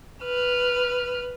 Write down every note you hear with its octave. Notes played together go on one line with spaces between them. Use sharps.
B4 F6